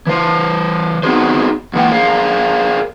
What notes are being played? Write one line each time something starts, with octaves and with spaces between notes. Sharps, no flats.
E3 C5
B3 C4 D#4 F#4 G#4 C5
G#2 E3 A#3 F#5 G5
G#4 A#4 C5 F5